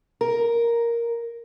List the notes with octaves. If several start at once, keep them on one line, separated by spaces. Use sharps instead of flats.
A#4